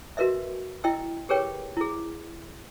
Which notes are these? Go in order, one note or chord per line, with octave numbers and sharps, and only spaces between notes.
F#4 A#4 B4 D#5 E5
E4 D#5 G5 E6
G4 G#4 A#4 B4 C#5 G5
E4 G#4